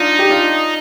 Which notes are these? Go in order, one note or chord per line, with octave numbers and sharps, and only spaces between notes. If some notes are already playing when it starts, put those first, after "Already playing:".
Already playing: D4 D#4 F4
G4
D4 F4